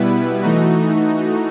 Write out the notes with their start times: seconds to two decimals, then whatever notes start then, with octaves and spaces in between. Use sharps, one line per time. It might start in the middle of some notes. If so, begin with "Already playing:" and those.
Already playing: B2 G3 B3 E4 B4
0.42 E3 A3 D#4 F#4